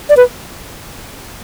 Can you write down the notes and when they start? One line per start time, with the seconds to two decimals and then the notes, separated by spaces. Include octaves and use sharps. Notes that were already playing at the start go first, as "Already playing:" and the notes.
0.10 D5
0.17 B4